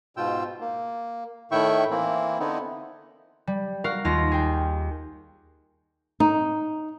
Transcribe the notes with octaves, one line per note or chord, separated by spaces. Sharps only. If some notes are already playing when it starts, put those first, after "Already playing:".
G#2 B2 F4 G5 E6
A#3
A2 D#3 E4 E5 G5 C#6
E3 A#3 C4 E4
D3 B3 C4 D#4 E4
G3
F#4 A#4 F5
D#2 F4 A#6
G#4 G5
D#4